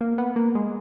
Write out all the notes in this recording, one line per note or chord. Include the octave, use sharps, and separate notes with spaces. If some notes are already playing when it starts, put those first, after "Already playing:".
A#3
B3
A#3
G#3